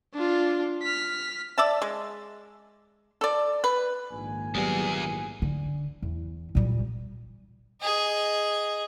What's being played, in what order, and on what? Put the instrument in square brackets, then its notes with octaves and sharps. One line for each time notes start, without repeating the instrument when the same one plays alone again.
[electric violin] D4 F4
F6 B6
[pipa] D5 E5 A5
G#3
A4 D5
B4
[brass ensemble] A#1 G#5 [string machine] G#2 D#3 A#3
[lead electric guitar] E2 G#4 [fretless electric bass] F#3 G3 B3
[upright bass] D3
E2
A#2 G3
[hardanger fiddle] G#4 D#5